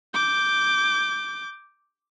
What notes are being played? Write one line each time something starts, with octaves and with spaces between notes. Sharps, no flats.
D6 G6